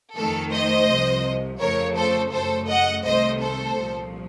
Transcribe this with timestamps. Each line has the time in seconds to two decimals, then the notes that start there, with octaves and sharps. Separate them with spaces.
0.16 F2 D#3 A3 A4
0.52 C5 D#5
0.88 C2 C3 F3
1.60 F2 C#3 F3 A3 A#4 C#5
1.96 A4 C5
2.32 F#2 C#3 A3 A4 C5
2.68 D#5 F#5
3.05 C2 C3 D#3 A3 C5 D#5
3.42 A4 C5
3.77 C2 A#2 F3